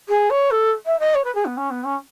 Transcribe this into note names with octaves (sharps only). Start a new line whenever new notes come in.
G#4
C#5
A4
E5
D#5
C#5
B4
G#4
B3
C#4
B3
C#4